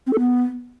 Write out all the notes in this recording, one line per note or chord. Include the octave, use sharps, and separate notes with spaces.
C4
A4
B3